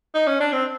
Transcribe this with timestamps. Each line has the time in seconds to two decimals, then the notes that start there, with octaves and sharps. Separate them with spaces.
0.14 D#4
0.27 C#4
0.40 D4
0.53 C4